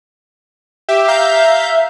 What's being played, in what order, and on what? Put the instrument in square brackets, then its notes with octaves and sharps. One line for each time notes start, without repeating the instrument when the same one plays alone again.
[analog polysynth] G4 [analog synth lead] E5
[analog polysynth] F5 A#5 G6